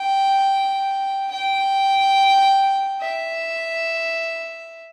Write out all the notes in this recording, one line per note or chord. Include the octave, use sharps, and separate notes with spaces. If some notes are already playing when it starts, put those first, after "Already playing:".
Already playing: G5
G5
E5